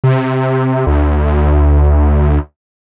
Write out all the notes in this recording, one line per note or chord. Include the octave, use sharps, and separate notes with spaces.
C3
D2